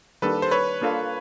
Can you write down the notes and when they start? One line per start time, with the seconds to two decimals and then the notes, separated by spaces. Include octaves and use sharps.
0.22 D#3 G3 A#3 D4 A4 B4
0.42 C5
0.51 B4 C#5
0.81 A#3 D4 F4 A4